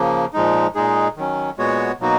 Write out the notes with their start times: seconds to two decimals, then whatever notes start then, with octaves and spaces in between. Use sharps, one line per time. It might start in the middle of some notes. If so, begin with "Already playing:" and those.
Already playing: C#3 F3 A#3
0.33 A#2 F3 G#3 D#4
0.75 A#2 G#3 D#4 G#4
1.17 D#3 F#3 C#4
1.58 A#2 G#3 B3 F#4 C#5
2.00 B2 F#3 A#3 D#4 F#4